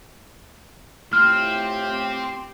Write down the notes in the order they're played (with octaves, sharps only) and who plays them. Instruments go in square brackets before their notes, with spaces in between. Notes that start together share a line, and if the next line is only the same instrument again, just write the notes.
[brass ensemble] A2 E4 F4 [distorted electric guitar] C4 [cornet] G4 [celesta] F6